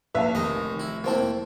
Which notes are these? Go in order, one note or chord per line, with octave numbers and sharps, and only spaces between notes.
A#1 B4 E5 F5 A5
F1 D#3 D#5 G#5
E4
A#3 C4 E4 F4 C5 A5